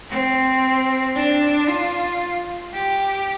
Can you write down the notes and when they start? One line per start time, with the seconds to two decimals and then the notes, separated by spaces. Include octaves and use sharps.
0.10 C4
1.15 D4
1.67 F4
2.73 G4